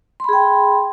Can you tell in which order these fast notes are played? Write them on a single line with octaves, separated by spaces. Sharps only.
C6 B5 G#4 G5